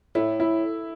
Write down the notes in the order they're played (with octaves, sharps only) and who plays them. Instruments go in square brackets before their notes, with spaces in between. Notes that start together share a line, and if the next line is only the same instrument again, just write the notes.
[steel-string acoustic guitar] A2 [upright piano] E4
[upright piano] E4